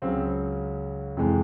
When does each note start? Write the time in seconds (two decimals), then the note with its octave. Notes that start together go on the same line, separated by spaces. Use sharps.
0.02 C#2 C#3 F#3 C4
1.17 F2 C3 E3 G#3